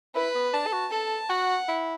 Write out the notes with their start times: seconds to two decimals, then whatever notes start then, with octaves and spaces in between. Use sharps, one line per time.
0.15 E4 B4
0.35 B3
0.53 D4 A5
0.67 A4
0.73 F#4
0.92 A4 A5
1.29 F#4 F#5
1.68 E4